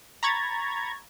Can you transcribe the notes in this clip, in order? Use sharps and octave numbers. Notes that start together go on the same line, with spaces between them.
A#5 B5 C#6 G#6 A6